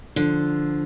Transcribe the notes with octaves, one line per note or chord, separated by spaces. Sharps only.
D3 F3